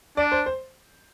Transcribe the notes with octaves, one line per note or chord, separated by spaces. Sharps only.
D4 D5
C5
C5